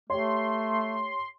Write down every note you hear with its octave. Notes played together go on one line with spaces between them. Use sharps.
A3 G4 C#5 C6